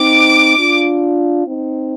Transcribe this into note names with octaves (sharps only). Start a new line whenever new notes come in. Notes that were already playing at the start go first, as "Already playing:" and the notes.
Already playing: C4 D#4 D6
D4 F4
C4 D#4